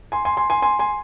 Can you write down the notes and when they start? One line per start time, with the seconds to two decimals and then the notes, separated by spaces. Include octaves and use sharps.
0.12 G#5 C6
0.25 G#5 C6
0.37 G#5 C6
0.50 G#5 C6
0.62 G#5 C6
0.79 G#5 C6